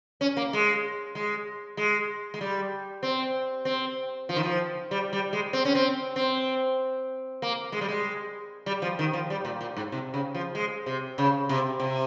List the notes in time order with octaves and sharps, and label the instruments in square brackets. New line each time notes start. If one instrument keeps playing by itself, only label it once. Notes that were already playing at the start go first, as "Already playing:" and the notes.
[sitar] C#4
A#3
G#3
G#3
G#3
G#3
G3
C4
C4
F3
D#3
F3
G3
G3
G#3
C4
C#4
C4
C4
A#3
G#3
G3
G#3
G3
F3
D#3
F3
G3
A#2
A#2
G#2
C3
C#3
F3
G#3
C3
C#3
C3
C3